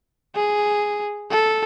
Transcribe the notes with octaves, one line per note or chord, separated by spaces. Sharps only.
G#4
A4